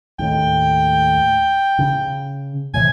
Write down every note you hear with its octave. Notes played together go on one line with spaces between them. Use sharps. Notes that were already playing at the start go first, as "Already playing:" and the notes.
D#2 A2 G5
C#3
A2 C3 E3 G#5